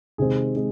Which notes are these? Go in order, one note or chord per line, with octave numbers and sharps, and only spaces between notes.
C3 D#3 G#3 C4 G#4
G#3 C4